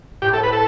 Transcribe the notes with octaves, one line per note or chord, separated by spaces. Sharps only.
A2 G4
A4
B4
A4